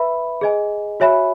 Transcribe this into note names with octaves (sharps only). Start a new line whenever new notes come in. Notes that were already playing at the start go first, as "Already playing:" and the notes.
Already playing: B4 E5 B5
G#4 D#5 G#5
F#4 C#5 E5 G#5 B5